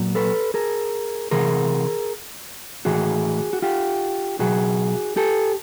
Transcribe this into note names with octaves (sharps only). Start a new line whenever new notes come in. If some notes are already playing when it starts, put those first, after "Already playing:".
Already playing: A#2 F#3
A4 B4
G#4 A#4
C3 E3 G#4 A#4
A2 E3 F#4 G#4
F#4
F4 G4
B2 F#3 F#4 G#4
G4 A4